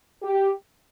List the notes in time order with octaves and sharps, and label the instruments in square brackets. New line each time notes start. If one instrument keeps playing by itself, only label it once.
[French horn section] G4